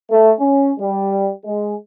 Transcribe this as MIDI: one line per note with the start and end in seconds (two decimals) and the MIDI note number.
0.11 0.32 57
0.40 0.72 61
0.80 1.31 55
1.45 1.74 56